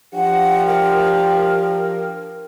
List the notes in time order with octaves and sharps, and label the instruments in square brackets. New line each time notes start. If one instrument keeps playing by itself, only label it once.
[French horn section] F3 D4 G4 [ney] F#5
[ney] A#4